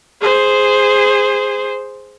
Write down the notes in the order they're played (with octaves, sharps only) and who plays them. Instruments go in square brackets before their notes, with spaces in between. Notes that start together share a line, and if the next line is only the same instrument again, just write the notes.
[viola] G#4 C5